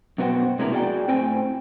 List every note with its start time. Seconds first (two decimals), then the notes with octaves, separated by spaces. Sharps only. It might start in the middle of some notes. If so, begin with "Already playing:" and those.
0.18 F#2 B2 B3 F#4 C5 G5
0.59 C3 G#3 B3 D4 E4 A#4
0.72 F#4 G#4 D5 E5 G5
1.08 A2 C4 C5 G5 G#5